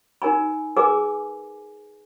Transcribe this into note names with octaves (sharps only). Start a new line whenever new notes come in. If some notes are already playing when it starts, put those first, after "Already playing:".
D#4 A#4 G#5 B5
G#4 A#4 B4 G#5 D6